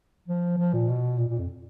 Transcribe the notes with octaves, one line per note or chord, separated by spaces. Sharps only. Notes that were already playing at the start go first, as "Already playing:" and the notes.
F3
F3
A#2
B2
A#2
A#2
F2